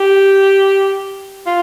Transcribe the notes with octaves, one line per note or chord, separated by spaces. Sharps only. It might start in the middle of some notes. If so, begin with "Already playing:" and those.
Already playing: G4
F4